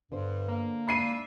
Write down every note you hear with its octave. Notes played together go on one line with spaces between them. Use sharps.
G2 D3 B3 C5
A#3
D4 D5 E5 B5 C7 D#7